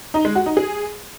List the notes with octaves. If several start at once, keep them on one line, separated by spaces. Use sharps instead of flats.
D#4
G#3
F#4
D#4
G#4